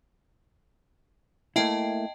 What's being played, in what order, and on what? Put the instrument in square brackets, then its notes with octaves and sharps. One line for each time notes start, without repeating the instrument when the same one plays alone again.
[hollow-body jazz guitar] A3 A#3 E4 [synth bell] D#5 G5 A5